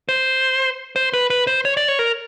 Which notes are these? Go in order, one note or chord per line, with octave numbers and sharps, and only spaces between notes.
C5
C5
B4
B4
C5
C#5
D5
C#5
A#4